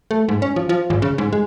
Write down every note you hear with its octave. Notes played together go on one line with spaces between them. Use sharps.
A3
G#2
C#4
F3
F3
G#1
C#3
G#2
G#3